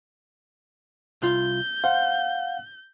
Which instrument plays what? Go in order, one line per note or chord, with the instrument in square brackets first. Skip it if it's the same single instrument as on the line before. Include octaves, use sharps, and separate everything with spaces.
[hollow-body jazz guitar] C2 F4 [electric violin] G6
[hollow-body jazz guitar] C5 [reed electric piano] F5 F#5